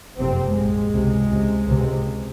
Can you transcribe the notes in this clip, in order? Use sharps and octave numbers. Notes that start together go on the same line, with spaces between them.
F#1 F2 C3 C4
A#1 G#2 G#3
C#2 C3
C#2 C3
C#2 C3